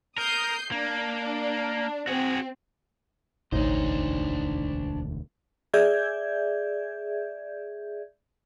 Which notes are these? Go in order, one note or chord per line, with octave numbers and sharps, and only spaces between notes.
A#4 D#6 G6 C7
A#3 D4
C4 F#4 G#4
E1 A1 D2 D4 D#4 C5 C#5
G#4 D5 E5 G6 G#6